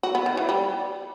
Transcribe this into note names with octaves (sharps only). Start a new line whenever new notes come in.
F#4
B3
D#3
E3
G3